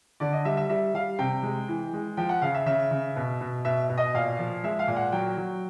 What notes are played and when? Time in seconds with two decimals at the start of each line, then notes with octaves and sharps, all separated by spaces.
0.20 D3 D5
0.33 D#5
0.45 G3 E5
0.57 E5
0.69 G3 E5
0.94 G3 F5
1.19 C3 G5
1.43 G#3
1.68 E3
1.93 G#3
2.17 F3 G5
2.29 F#5
2.42 C#3 F5
2.54 E5
2.66 C#3 E5
2.91 C#3
3.16 B2
3.41 B2
3.65 B2 E5
3.89 B2
3.97 D#5
4.14 A#2 F5
4.39 F3
4.63 G#3 E5
4.79 F5
4.88 A#2
4.96 F#5
5.12 F#3 G5
5.37 F#3